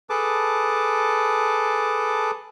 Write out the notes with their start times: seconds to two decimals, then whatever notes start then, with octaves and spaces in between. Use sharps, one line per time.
0.10 G#4 A4 B4 A5 D6